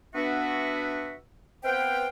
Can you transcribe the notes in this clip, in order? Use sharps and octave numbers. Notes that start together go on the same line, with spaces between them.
B3 D4 F#4 E5
B3 C4 B4 C5 F5 G5